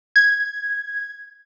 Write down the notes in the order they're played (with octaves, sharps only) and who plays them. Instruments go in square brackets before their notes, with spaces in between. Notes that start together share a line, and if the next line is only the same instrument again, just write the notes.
[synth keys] G#6